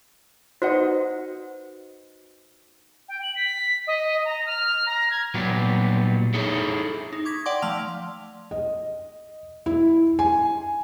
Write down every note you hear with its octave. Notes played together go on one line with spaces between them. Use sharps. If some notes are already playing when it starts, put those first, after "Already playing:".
D#4 F#4 B4 C5 D#5 F#5
G5
F#7
B6
D#5
A#5
F6
A#5
G#6
A#2 F#3 G3 B3
D#4 E4 G#4 A4 C#5
D#4
C#6 D6 G#6 B6
D5 F#5 G5 C6 D6
F3 A3 A5 F6 F7
D#5
E4
G#5